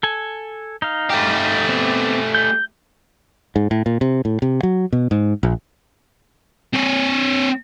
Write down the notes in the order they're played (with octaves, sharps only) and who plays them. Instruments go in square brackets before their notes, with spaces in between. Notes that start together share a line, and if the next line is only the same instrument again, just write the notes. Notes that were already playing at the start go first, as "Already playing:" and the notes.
[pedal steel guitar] A4 G#5
D#4 F5
[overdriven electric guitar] A3 G4
[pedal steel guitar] B3 C4
G6
[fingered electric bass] G#2
A2
A#2
C3
A2
C3
F#3
B2
G#2
A#1
[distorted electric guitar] C4 C#5